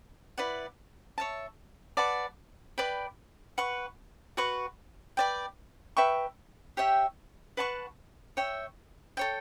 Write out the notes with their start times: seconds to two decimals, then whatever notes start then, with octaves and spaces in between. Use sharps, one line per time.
0.38 E4 B4 D5 F#5
1.18 C#5 E5 A5
1.97 B4 D5 F#5 A5
2.78 B4 D5 G5 B5
3.58 B4 F#5 C#6
4.37 F#4 B4 F#5 C#6
5.17 B4 D5 G5
5.97 B4 E5 G5 C#6
6.77 G4 C#5 E5 G5
7.57 B4 F#5 A5 C#6
8.37 C#5 E5 G5
9.17 A4 C#5 G5